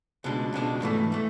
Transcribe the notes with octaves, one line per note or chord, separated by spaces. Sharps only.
C#2 B2 G#3 D4
C#2 B2 G#3 D4
G#2 E3 A3
E3 A3